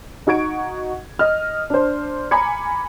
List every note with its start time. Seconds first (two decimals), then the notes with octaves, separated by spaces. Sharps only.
0.27 D#4 F#4 C#6 G#6 D7
1.19 D#5 F6
1.70 D4 C5
2.31 G#5 A#5 B5 D6 G#6 C#7